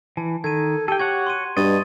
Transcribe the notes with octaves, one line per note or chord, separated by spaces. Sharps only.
E3 A5
D#3 A4 G#6 D#7
G4 A4 G5 D#7
F#4 C#5 F#5 G#6
C6 C#6 D#7
G2 B2 D#5 C#6 A6 D#7